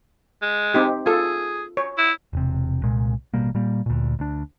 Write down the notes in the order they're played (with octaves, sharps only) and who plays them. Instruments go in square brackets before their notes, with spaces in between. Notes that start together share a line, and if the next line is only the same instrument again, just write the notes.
[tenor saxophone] G#3
[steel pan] C4 D#4 G4
[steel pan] F4 A4 [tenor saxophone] G#4
[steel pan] C#5
[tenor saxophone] E4
[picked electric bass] E1 C3
C2 A#2 G#3
A1 B2 G3 A#3
A#2 G3 A#3
D2 A#2
D2 D4